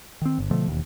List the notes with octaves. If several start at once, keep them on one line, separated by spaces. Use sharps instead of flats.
D#3 C4
G1
B2 D3 F3 A3
E1 D#2